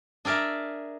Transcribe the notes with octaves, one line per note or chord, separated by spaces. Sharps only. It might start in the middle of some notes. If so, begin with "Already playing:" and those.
D4 G#4 A#4 D5 E5